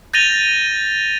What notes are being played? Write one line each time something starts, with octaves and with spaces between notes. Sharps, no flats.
G6 A6 A#6 D#7 F7 G7